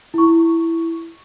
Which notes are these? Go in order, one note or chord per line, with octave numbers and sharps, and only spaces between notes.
E4 C#6